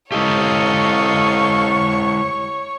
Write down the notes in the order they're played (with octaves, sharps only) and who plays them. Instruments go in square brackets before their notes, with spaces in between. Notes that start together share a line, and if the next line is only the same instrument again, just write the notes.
[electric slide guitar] G#3 E4 G4 [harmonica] A4 D#5 F5 [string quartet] C#5 C#6